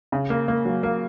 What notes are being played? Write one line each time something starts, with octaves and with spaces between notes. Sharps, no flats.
C#3
A#3
A#3
F#3
A#3